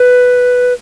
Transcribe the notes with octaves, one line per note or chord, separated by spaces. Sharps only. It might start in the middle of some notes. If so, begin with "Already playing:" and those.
Already playing: B4